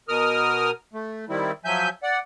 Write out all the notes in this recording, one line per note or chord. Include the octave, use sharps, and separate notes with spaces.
B2 A#4 D#6 F6
A3
D#3 G3 C4 E4
F3 F#3 E5 G#5 G6
D5 F#5